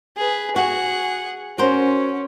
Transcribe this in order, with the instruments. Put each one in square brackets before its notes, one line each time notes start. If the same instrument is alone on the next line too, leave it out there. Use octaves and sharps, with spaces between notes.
[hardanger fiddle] G#4 B4
[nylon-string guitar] F#4 [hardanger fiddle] G#4 F#5
[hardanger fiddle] C#4 [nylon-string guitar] F#4 A#4 C5